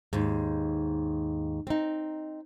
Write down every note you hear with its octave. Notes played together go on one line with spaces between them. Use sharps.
D#2 G#2
C4 D#4